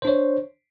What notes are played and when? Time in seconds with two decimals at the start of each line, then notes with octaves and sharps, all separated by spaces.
0.02 C5
0.05 D4
0.07 C#5